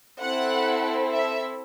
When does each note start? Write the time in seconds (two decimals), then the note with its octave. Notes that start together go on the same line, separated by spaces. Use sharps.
0.20 C4 E4 A4 F#5
1.12 E5